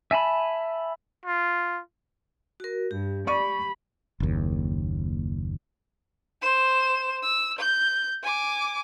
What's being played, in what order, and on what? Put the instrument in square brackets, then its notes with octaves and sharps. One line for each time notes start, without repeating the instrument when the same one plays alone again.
[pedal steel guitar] E5 G#5 A5 B5
[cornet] F4
[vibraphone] F#4 A#4
[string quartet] G2 [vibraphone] G4
[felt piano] D5 C#6 D#7 [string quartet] B5
[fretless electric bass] F#1 D#2
[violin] C5 E7
E6
G6
G#5 D6